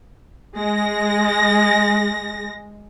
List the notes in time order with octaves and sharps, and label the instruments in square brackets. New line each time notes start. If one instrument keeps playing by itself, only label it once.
[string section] G#3 A#6